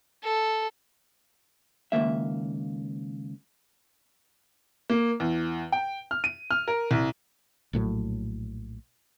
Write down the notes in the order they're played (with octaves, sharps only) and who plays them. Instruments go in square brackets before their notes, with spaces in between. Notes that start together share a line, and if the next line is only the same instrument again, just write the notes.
[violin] A4
[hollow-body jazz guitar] C#2 G2 D#3 A#3 E5
[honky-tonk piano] A#3
E2
G5
F6
D#7
F6
A#4
C2
[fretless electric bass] A#1 A2 F3 F#3